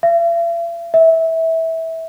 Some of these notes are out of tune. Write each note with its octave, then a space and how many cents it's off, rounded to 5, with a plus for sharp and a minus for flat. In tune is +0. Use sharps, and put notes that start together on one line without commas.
E5 +45
E5 -20